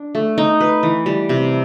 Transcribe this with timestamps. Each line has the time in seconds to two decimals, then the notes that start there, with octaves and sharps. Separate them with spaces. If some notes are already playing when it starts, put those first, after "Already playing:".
Already playing: D4
0.15 A3
0.38 D#4
0.61 B4
0.83 E3
1.06 G3
1.29 C3